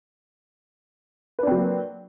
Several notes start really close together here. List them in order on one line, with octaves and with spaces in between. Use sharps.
B4 D4 C4 F#3 A#3